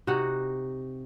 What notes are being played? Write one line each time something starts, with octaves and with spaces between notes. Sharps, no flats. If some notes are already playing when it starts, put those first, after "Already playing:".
C3 D#4 F#4 F#5